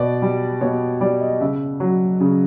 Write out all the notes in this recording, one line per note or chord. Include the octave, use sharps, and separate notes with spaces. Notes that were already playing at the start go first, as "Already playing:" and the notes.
Already playing: B2 D5
G3
B2 C#5
G3 D5
D#5
C#3 E5
F#3
C#3